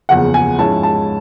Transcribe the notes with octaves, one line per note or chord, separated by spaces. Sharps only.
F#1 E2 C#3 F3 F#5
G#5
G#2 F3 G#3 C#4 E4 A5
A5